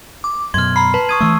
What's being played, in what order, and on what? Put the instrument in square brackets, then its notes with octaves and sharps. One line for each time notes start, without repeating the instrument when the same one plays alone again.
[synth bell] D6
[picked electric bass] F#2 B2 [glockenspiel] C6 F6 [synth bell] G#6
[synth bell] A#5 B5 [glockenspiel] C7
[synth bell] B4 [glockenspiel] A5
[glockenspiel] C#6 D#6 G#6 [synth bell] D#7
[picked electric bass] E3 A3 [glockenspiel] C#6 E6